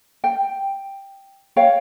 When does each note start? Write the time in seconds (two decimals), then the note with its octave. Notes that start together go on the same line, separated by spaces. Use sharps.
0.24 G5
1.56 C#5 F5 G5